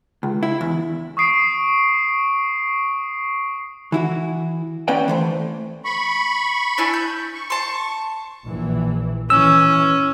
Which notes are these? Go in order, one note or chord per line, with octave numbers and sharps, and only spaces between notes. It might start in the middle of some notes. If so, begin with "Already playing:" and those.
C#2
E4
E2
C#6 D#6 C7 D7
E3 E4 F#4
A#3 C#4 B4 D5 F#5 G5
E3 A3 C5
B5 C#6
D4 E4 G#5
G6
C#6
A5 C6
A#1 E3
E3 C#4 E6